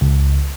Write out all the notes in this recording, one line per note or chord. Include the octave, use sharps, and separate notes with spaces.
C#2